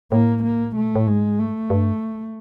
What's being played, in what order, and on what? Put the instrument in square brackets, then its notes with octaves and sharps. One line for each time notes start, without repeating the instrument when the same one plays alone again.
[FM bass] A2 [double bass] A#3
[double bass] A#3
[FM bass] B2 [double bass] A3
[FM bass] A#2
A2
[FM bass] G#2 [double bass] G#3
[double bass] A3
[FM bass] G2